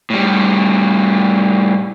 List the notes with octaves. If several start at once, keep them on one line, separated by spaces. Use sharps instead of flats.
A2 G3